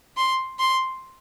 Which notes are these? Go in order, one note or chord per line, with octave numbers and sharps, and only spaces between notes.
C6
C6